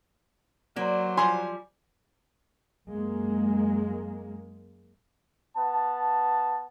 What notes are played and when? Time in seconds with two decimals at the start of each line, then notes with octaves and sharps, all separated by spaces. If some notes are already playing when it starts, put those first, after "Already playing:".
0.76 F#3 A#3 C5 D5
1.17 F3 G3 G#5 C6
2.87 F#2 G#3 A#3
5.57 B3 A5